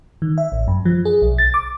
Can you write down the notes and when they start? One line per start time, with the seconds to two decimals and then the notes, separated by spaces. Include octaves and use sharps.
0.22 D#3
0.38 E5
0.52 A1
0.68 F#2
0.85 F3
1.05 G#4
1.22 B1
1.38 A6
1.54 D6